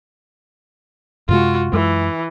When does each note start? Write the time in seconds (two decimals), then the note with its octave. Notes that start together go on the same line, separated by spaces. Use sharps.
1.29 F#2 C3 G#3 F4 F#4
1.73 F#2 E3 G#3